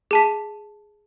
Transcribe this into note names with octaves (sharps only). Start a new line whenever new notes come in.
G#4 A5 B6